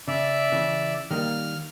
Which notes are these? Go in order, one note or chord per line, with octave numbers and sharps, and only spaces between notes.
C#3 D5 E5
C#3 E3
D#3 G3 A#3 F6